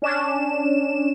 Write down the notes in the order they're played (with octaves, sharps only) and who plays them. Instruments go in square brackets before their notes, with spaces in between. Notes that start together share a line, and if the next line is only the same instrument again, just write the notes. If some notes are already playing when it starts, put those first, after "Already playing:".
[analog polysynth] C#4 D4 E7